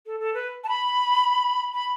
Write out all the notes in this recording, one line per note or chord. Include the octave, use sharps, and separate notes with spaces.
A4
A4
B4
A5
B5
B5